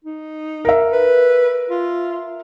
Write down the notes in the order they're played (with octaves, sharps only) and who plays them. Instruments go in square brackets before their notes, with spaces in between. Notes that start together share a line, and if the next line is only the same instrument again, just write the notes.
[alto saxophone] D#4
[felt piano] A#4 E5
[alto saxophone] B4
F4